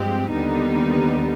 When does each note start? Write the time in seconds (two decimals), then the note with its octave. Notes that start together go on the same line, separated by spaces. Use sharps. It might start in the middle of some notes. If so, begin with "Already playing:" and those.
Already playing: G2 F3 G#3 C4 G4
0.31 D#2 D3 G3 B3 D#4